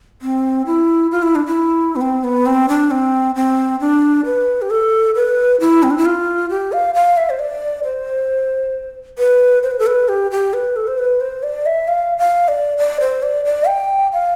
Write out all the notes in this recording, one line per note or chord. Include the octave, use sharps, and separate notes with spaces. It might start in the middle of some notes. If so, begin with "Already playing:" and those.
C4
E4
F4
E4
D4
E4
B3
C4
B3
C4
D4
C4
C4
D4
B4
G4
A4
B4
E4
C4
D4
E4
F4
G4
F5
F5
E5
C5
D5
C5
B4
C5
B4
A4
B4
G4
G4
B4
A4
C5
B4
C5
D5
E5
F5
F5
D5
D5
C5
D5
D5
G5
F5